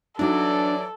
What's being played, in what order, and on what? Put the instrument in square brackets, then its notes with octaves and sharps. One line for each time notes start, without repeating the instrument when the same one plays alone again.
[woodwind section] E3 F#3 D5 [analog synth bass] D4 [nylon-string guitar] D#4 F#4 [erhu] A4